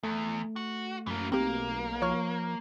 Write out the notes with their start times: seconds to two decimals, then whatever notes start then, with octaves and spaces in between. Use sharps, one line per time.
0.03 E2 A3
0.56 F#4
1.07 F#2 E3 A#3
1.32 B1 A#3 C4 G4
2.02 F3 C#5 C#6 F6